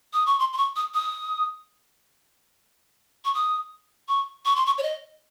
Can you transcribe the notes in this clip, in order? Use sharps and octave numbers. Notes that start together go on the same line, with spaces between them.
D#6
C#6
C6
C6
C#6
D#6
D#6
C#6
D#6
C#6
C#6
C6
C#6
C#5
D#5